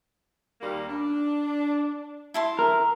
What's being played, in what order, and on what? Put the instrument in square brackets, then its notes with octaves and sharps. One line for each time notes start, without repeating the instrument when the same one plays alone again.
[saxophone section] D#2 G3 A#3
D4
[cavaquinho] E4 A5 C6
[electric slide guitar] A#4